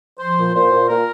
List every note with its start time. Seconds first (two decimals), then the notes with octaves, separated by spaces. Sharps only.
0.20 F3 C5
0.38 A#2
0.55 A#2 C5
0.71 A#2
0.89 A#2 A#4